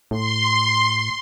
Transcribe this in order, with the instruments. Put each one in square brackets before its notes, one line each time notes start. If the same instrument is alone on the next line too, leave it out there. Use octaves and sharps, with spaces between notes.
[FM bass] A2 [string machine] C6